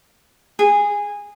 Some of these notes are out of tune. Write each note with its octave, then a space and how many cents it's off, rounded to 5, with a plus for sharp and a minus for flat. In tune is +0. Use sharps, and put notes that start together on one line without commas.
G#4 -15